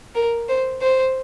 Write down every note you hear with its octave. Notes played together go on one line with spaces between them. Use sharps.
A#4
C5
C5